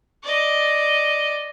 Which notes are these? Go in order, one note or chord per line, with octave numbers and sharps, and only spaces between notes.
D5 D#5